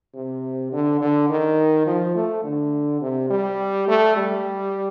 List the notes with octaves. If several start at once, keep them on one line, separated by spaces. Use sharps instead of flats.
C3
D3
D3
D#3
F3
A3
D3
C3
G3
A3
G3